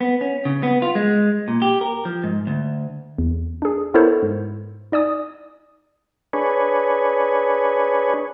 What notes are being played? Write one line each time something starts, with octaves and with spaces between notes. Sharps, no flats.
B3
C#4
C#3
B3
F4
G#3
A#2
G4
A#4
F3
G#2
D2
E2
D4 G#4
B3 E4 A4 A#4 C5 C#5
G#2
D#4 D5 G#5 D#6
D4 G#4 B4 C#5